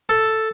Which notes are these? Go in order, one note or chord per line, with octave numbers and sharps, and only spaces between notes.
A4